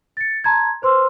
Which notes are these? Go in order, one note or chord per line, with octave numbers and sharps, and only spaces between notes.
A6 C#7
A5 A#5 C6 G#6
B4 C5 C6 E6 F6